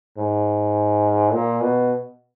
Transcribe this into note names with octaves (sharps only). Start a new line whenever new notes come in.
G#2
A#2
B2